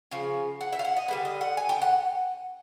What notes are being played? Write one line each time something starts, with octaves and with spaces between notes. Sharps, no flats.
C#3 F3
F#5
E5
F5
F#5
D#5
D3 G3 B3
D#5
F#5
G#5
G5
F#5